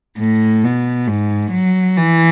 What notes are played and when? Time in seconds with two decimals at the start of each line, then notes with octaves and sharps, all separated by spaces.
0.18 A2
0.64 B2
1.08 G#2
1.52 F#3
1.96 E3